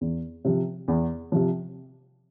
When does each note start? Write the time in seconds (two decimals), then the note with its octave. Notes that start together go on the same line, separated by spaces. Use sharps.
0.01 E2
0.45 C3 F3
0.88 E2
1.32 C3 F3